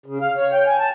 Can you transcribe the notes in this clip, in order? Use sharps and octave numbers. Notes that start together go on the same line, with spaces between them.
C#3
F5
C#5
G5
G#5
A5